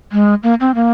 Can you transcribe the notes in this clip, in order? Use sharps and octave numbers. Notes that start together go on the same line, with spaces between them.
G#3
A#3
C4
A#3